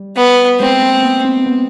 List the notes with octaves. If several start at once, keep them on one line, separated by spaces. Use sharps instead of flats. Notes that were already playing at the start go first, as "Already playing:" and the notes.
Already playing: G3
B3
G#3 C4
A#3
B3
C4
B3